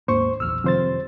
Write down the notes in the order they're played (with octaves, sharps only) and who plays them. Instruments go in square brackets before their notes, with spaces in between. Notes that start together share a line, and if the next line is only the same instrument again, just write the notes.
[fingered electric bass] D#2 G#2 A#3 [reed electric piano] C5 C#6
[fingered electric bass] A#1 E2 [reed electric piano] E6 F6
[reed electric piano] F2 C5 A6 [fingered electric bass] C3 D#3 G3